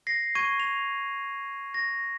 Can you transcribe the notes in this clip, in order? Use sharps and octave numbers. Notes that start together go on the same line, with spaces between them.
A#6 C7
C#6 G#6 D#7
F7
A#6